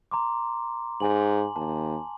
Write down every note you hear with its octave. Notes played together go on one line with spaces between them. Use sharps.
A#5 C6 D6
G#2 G#5 F#7
D#2 A5